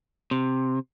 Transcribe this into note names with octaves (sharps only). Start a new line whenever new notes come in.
C3